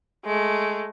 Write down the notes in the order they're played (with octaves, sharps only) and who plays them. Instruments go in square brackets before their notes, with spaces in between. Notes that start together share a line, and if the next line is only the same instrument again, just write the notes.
[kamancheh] G#3 A3